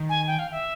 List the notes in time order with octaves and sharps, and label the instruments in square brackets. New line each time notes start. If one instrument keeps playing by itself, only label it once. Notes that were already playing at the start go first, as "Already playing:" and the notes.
Already playing: [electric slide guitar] D#3
[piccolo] G#5
G5
F5
E5